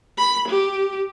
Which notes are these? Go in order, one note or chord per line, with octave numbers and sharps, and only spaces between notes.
B5
G4